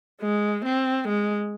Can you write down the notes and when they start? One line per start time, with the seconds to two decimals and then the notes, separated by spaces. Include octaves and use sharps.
0.21 G#3
0.66 C4
1.09 G#3